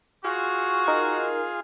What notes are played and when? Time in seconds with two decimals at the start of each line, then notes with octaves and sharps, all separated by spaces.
0.25 F4 F#4 G#4 C#6
0.88 D#4 A#4